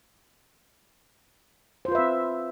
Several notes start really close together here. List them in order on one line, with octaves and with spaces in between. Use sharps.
C5 F4 B4 E5 C4